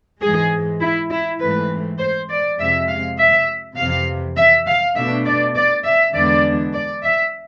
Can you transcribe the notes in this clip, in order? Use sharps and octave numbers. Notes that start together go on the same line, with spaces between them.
G#2 E3 G#3 G#4
E4
E4
G#2 E3 A3 C4 B4
C5
D5
F2 C3 G#3 E5
F5
E5
F2 C3 E3 F5
E5
F5
B2 A3 D4 E5
D5
D5
E5
E2 D3 G#3 B3 D4 D5
D5
E5